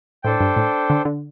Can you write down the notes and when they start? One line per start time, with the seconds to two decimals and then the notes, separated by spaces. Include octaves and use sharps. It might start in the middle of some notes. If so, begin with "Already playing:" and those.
0.23 A2 D4 A4 C5 G5
0.40 G2
0.56 A2
0.90 D3
1.05 D3